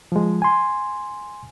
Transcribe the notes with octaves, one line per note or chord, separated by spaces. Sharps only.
F3 G#3
G#5 C6